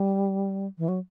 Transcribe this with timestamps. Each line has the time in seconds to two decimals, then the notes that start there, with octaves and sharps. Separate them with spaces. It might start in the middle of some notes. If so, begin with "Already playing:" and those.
Already playing: G3
0.78 E3
0.88 F#3